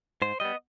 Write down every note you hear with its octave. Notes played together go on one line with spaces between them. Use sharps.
G#2 C5
G3 B3 D#5